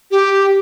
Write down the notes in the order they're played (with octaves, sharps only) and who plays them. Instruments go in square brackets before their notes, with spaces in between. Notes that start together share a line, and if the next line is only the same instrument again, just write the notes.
[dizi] G4